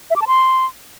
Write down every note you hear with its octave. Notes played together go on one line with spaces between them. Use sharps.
E5
D6
A5
C6